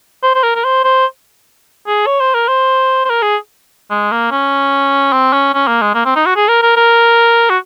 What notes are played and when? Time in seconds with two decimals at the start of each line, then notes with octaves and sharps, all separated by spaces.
0.23 C5
0.35 C5
0.44 A#4
0.56 A#4
0.64 C5
0.84 C5
1.87 G#4
2.07 C#5
2.20 C5
2.35 A#4
2.48 C5
3.05 C5
3.10 A#4
3.22 G#4
3.91 G#3
4.12 A#3
4.31 C#4
5.13 C4
5.33 C#4
5.54 C#4
5.68 A#3
5.82 G#3
5.94 A#3
6.06 C4
6.16 D#4
6.26 F#4
6.36 G#4
6.49 A#4
6.63 A#4
6.77 A#4
7.50 F#4